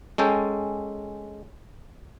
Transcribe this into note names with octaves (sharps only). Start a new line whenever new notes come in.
G#3 C#4 A4 G5